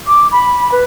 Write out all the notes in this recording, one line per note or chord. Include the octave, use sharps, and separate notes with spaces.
D6
B5
B4